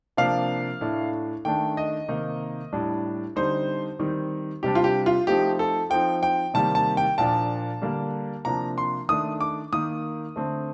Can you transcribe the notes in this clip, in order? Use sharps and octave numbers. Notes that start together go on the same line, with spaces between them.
C3 F3 A#3 D4 F5
A2 A3 D4
D#3 A3 D4 G5
D#5
C3 D#3 A#3 D#4
A2 G3 D4
D3 G3 C4 D#4 C5
D#3 G3 C4 D#4
C3 G3 D4 G4
F4
G4
F4
F3 A3 C4 D#4 G4
A4
F3 C4 D#4 G5
G5
C3 D#3 G3 A#3 A5
A5
G5
A#2 F3 A#3 D4 A5
D3 G3 A#3 D4
C3 F3 A#3 D4 A#5
C6
D#3 A3 D4 D#6
D6
D#3 A#3 D#4 D#6
D3 A3 C4